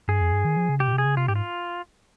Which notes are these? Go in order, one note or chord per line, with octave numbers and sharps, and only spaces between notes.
G2 G#4
F2
G2
D#3
F3
C#3
C3 G4
A#2
C3
G#4
C#3
C3 F4
G#2 G4
F4